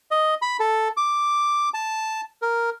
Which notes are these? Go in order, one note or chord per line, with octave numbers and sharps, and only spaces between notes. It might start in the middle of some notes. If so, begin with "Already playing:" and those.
D#5
B5
A4
D6
A5
A#4